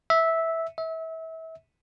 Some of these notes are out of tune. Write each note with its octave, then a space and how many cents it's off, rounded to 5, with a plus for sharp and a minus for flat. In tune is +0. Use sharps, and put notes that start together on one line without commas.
E5 -10
E5 -30